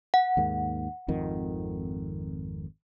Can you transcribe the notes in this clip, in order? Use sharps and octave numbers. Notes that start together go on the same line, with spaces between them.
F#5
D#2 G#2 A#3
G#1 F2 D#3